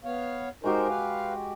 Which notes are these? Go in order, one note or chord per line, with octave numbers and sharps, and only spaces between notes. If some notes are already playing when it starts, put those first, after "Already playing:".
B3 C#5 F5
G#3 D#4 F#4 G4 A#4 C5
B4 F5